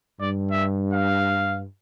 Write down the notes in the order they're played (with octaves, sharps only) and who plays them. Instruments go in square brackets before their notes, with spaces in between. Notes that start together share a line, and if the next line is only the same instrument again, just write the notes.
[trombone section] G2 [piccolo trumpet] D5
[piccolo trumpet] E5
F5